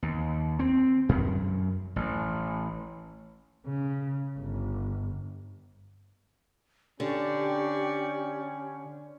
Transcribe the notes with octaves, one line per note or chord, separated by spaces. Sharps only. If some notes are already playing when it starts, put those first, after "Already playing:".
D#2
C4
F#2
A1
C#3
G1
D3 C#4 G4 D5 C#6